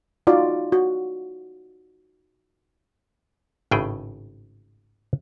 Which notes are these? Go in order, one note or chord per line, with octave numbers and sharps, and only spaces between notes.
D#4 F4 F#4 D5
F#4
G#1 A2 C#3 A3 G#4 G5